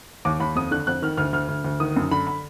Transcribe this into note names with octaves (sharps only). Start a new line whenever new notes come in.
D#2 D6
D#2 B5
F2 D#6
D3 F#6
F2 F#6
D#3 F6
D2 F6
D2 F6
D2
D2
D#3 D#6
F#2
D3 B5
B5